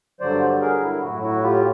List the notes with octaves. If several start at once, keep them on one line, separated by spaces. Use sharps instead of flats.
G2 D3 F#3 C5 D5
G#4 A#4
E4
A2 F#3 E4 F#4
E4 F#4
F4 G4